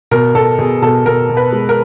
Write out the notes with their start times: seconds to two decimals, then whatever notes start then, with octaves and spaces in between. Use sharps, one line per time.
0.11 B2 A#4
0.35 B2 A4
0.59 B2 G#4
0.82 B2 A4
1.06 B2 A#4
1.29 B2
1.37 B4
1.53 G#3
1.69 A#4